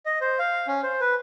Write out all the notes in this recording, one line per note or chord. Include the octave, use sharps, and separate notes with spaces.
D#5
C5
F5
C#4
C5
B4